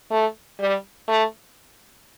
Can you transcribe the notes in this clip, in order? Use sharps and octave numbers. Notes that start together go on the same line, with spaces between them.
A3
G3
A3